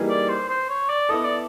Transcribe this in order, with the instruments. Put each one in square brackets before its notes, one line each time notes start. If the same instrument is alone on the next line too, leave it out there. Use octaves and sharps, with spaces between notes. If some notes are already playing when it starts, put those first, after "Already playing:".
Already playing: [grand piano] E3 G3 A#3 D#4 G#4
[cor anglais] D5
C5
C5
C#5
D5
[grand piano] B3 E4 A4 [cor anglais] D#5
[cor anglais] D5